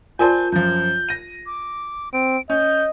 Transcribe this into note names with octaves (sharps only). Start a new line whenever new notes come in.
F4 A#4 C5 D5 G#5 A5 G6
F#2 F3 G6
A#6 D#7
D6
C4 D7
C#4 D#5 G6